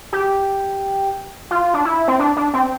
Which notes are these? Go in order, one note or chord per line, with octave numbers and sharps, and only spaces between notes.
G4
F4
D4
E4
C4
D4
D4
C4